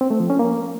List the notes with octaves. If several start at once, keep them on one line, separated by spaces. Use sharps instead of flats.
C4
A3
F3
C#4
A#3